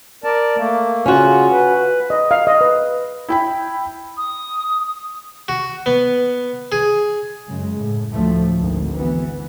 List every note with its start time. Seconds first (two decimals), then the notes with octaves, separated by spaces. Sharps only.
0.24 A#4 D5 A5
0.57 A3 A#3
1.06 C#3 C#4 F4 F#4
1.52 B4
2.10 D#5
2.31 F5
2.47 D#5
2.61 B4
3.29 E4 G5 B5
4.17 D#6
5.48 F#4
5.86 B3
6.72 G#4
7.47 F#2 C#3 G#3
7.76 A2
8.12 D2 A2 F3 A3
8.60 G#1 D2
8.93 E3 B3